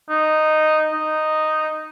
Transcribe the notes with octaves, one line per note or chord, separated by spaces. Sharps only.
D#4
D#4